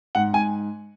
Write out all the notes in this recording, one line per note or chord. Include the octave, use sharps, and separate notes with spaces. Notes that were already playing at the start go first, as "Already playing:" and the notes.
G#2 F#5
G#2 G#5